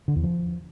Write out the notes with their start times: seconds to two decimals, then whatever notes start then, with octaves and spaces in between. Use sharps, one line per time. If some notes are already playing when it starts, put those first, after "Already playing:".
0.08 D3
0.16 E2
0.24 F3